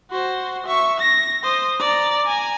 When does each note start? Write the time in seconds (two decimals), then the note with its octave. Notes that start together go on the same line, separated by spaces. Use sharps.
0.11 F#4 C5
0.66 E5 C#6
1.00 A#6
1.43 C5 D#6
1.80 D5 A#5
2.26 G#5 A#5